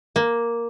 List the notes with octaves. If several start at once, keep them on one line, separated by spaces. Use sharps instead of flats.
A#3